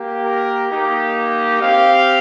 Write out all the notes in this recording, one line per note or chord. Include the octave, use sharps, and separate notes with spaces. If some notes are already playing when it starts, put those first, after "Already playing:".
Already playing: A#3 G4
A#4
A#3 D#4 G4
C4 G4 F5